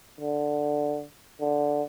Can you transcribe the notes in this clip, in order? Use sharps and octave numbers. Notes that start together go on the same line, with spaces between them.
D3
D3